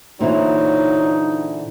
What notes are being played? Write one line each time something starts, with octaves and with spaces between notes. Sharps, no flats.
A#2 D3 E3 F#3 D4 D#4 C5 E5